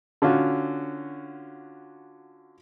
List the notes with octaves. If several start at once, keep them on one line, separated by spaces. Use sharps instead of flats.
D3 C#4 F4 F#4